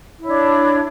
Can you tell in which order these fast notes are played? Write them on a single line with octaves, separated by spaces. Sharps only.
E4 C#5 D4